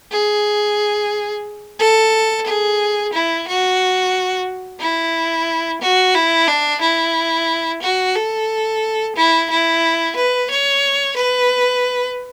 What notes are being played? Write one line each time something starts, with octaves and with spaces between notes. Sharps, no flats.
G#4
A4
G#4
E4
F#4
E4
F#4
E4
D4
E4
F#4
A4
E4
E4
B4
C#5
B4